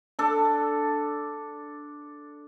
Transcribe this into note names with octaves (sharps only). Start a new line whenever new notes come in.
D4 A4